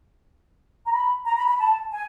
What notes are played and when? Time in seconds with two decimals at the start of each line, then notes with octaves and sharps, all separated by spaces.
0.85 A#5
0.93 B5
1.26 A#5
1.37 B5
1.48 B5
1.59 A5
1.92 G#5